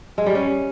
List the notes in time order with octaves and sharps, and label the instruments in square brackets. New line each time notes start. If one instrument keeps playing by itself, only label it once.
[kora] G#3
G3
C#4